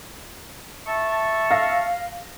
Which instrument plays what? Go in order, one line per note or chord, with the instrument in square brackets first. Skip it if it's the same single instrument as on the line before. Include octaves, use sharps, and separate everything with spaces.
[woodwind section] E5 A5 C#6
[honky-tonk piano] F5 A#6